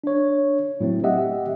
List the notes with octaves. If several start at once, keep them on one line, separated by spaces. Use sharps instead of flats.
D4 C#5
A2 F#3 A3 C4
G4 D#5 E5 F#5